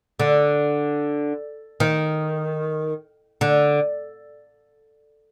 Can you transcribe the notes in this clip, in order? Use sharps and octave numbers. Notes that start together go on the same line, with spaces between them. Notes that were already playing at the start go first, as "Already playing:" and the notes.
D3
D#3
D3